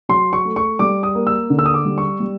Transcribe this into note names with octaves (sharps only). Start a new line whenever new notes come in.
F#3 C6
C#6
A3
C#6
G3 D6
D#6
A#3
E6
D3
E6
D#6
D6
G3
C#6
G3